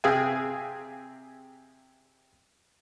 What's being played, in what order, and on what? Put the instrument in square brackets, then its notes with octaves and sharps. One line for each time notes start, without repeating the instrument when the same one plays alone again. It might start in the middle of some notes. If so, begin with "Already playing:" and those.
[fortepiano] C3 G#4 E5 F5 G5 G#5